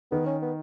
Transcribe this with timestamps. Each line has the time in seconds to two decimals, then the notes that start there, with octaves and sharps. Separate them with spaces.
0.11 D#3 B3
0.26 C#4
0.42 B3